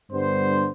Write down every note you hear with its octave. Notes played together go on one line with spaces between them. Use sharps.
G2 D3 G3 B3 D4 C5